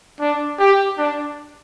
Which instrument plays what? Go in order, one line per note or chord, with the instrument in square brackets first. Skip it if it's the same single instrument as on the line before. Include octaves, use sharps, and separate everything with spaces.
[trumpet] D4
G4
D4